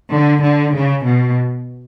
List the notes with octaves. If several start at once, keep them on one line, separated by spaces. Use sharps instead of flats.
D3
D3
C#3
B2